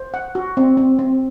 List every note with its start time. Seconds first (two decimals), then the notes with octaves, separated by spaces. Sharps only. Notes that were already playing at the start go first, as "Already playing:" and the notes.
Already playing: C5
0.14 F#5
0.35 F#4
0.57 C4
0.77 C4
0.99 C4